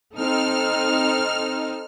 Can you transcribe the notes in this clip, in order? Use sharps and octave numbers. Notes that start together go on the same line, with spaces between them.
C4 D#4 A4 F6